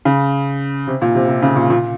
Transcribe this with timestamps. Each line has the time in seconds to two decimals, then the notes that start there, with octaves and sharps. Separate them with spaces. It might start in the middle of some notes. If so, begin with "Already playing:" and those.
0.05 C#3
0.87 C3
1.02 A#2
1.15 C3
1.28 C3
1.42 C#3
1.56 A#2
1.70 A#2